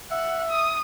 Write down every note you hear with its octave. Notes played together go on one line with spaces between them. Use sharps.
E5 F#5
D#6